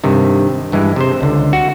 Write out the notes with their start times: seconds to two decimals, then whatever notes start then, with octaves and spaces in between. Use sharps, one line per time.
0.04 G2 C3 D#3
0.72 G2 E3 G#3
0.96 C3 C5
1.21 C#2 D3
1.53 F#4